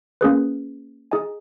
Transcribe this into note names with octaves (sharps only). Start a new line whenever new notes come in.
A#3 C#4 G#4 B4
D#4 G#4 D#5 G#5